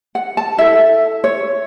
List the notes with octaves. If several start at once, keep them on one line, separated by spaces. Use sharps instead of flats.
F#5
A5
E4 A4 E5
C#5